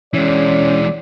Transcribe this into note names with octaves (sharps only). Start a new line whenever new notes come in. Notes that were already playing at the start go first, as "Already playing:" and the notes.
E3 G#3 C#4 D5